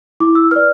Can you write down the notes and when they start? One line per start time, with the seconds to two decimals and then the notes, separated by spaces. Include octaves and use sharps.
0.20 E4 D6
0.35 E6
0.51 B4 D5 F6